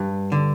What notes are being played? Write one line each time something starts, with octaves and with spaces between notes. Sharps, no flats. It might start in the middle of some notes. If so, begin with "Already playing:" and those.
Already playing: G2
D3